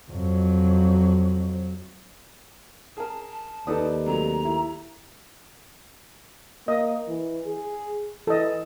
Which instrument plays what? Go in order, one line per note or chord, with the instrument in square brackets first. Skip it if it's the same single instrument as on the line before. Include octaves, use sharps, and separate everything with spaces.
[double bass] F2 F#3
[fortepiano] G#4 A#4 [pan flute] A5
[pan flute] A5
[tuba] D#2 [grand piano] D#4 B4 D5 [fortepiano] A4 D#6
[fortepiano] C3 F#3 A3 [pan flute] A#5
[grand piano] E4
[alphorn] A#3 [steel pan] D#5
[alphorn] E3
G#4
[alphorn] E3 [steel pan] A4 D#5